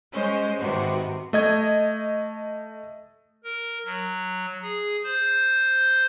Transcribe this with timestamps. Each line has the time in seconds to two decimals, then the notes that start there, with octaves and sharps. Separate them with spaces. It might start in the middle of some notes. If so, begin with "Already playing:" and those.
0.11 G#3 C#4 C5 D#5
0.59 G#2 C3 D#3 B3 F#4
1.33 A3 D#5 G#6
3.44 A#4
3.85 F#3
4.62 G#4
5.04 C5